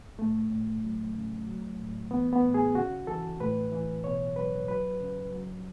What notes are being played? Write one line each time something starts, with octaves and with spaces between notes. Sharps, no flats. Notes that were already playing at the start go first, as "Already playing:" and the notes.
A2 A3
A2
F#3
C#3
F#3
A2
E3 B3
B3
A2
G#4
C#3 F#4
E3 A4
A2 B4
E3
B2 C#5
F#3 B4
F#3 B4
C#3
F#3